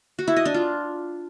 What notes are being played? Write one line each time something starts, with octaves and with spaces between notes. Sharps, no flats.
F#4
E4
D#5
D4
F4